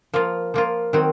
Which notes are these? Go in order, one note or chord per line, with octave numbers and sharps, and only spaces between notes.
F3 A#3 F4
F3 A#3 F4
D#3 F#3 C4